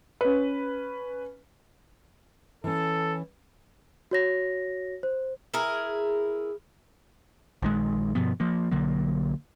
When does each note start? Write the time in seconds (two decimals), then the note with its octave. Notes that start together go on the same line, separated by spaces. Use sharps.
0.21 C#4 B4
2.64 E3 C#4 A4
4.11 F#4 C#5 A#6
5.03 C5
5.54 E4 G#4 A#4
7.62 A#1 D#3 G#3
8.15 G2 B2 F3 B3
8.40 F3 A#3
8.72 B1 D3 F#3 A#3